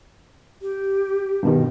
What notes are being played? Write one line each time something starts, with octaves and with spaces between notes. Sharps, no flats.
G4
G2 B2 D#3